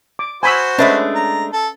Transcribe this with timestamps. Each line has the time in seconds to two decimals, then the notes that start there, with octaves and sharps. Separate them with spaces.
0.19 D6
0.43 F#4 C5 G#5 B5 E6
0.79 G#3 A3 C#4 D4 B4 E5
1.15 A#5
1.53 A4